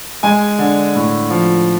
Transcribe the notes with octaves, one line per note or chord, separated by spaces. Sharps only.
G#3 G#5
D3
A2
F3